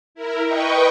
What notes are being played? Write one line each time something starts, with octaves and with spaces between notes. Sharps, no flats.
E4 A#4
B4 D#5 G5 C#6